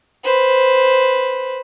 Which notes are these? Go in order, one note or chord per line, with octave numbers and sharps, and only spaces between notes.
B4 C5